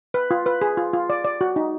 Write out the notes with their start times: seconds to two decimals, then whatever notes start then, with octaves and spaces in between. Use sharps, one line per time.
0.14 B4
0.31 F4
0.46 B4
0.62 G#4
0.77 F4
0.93 F4
1.10 D5
1.25 D5
1.41 F#4
1.56 D#4